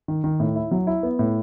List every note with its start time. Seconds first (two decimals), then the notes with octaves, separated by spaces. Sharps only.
0.08 D#3
0.24 D#3
0.40 A2
0.56 E4
0.71 F#3
0.87 E4
1.03 B3
1.19 A2